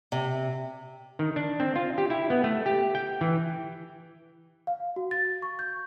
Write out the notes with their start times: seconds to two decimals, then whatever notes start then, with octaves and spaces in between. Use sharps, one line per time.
0.12 C3
1.19 D#3
1.36 D4
1.60 C4
1.76 F4
1.98 G4
2.10 E4
2.30 B3
2.44 A3
2.66 G4
2.95 G5
3.21 E3
4.67 F5
4.96 F#4
5.11 A6
5.42 C#6
5.59 G6